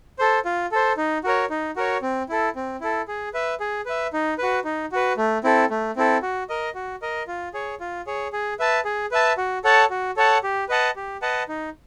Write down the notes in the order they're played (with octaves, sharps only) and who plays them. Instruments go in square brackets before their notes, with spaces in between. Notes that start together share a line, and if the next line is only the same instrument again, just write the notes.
[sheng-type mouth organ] A4 C5
F4
A4 C5
D#4
F#4 A#4 C#5
D#4
F#4 A#4 C#5
C4
E4 A4
C4
E4 A4
G#4
B4 E5
G#4
B4 E5
D#4
F#4 B4
D#4
F#4 B4
A3
C4 E4 A4
A3
C4 E4 A4
F#4
A#4 D#5
F#4
A#4 D#5
F4
G#4 C#5
F4
G#4 C#5
G#4
B4 E5 A5
G#4
B4 E5 A5
F#4
A4 C#5 F#5 A5
F#4
A4 C#5 F#5 A5
G4
B4 D#5 F#5 A5
G4
B4 D#5 F#5 A5
D#4